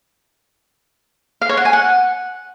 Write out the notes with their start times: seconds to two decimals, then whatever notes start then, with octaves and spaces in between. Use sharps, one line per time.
1.41 F5
1.49 C#5
1.57 F#5
1.65 G#5
1.73 F#5